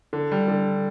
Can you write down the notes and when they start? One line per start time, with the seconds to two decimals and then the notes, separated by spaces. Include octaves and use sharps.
0.13 D3
0.32 G3
0.48 D3